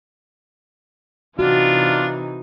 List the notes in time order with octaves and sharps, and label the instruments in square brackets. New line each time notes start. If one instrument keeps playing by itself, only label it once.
[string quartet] C3 E3 D#4 [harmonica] D4 F4 [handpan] F#4